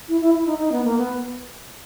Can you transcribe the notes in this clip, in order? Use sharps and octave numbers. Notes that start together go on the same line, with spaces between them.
E4
E4
E4
D#4
D#4
B3
A#3
B3